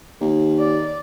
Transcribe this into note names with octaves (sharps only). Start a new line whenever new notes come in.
D#2
D5